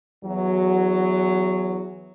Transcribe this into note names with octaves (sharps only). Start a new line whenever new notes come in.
E2 F#3